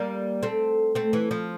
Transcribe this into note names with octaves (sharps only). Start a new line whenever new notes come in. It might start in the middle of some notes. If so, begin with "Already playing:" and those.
Already playing: G3 A#3
A3 C4
A3 C4
E3
F3